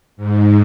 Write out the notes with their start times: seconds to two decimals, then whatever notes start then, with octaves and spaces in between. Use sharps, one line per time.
0.17 G#2